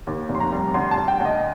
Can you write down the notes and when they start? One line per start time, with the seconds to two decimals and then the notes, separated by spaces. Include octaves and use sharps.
0.07 D#2
0.29 F1
0.35 C6
0.40 A#5
0.52 G3
0.74 D2 C6
0.91 A5
0.97 D2
1.08 G5
1.20 D2 D#5